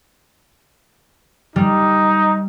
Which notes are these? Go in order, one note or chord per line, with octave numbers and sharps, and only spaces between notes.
G3 D#4